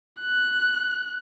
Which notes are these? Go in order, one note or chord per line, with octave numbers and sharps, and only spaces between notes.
F#6